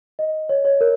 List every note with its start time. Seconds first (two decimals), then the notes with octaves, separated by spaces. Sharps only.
0.19 D#5
0.49 C#5
0.65 C#5
0.81 A#4